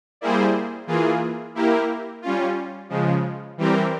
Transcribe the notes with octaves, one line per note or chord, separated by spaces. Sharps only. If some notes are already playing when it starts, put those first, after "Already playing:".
G3 A#3 E4 G#4 C5
E3 A#3 F4 G#4
A#3 E4 G4 A#4
G3 C#4 F4
C#3 F3 G#3
E3 G3 C4 G4 A#4